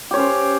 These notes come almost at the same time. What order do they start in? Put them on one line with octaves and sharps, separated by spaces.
G4 C#5 C#4 C5